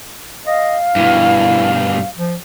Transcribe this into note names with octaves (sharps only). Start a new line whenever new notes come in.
D#5 F5
G2 B2 E4
F3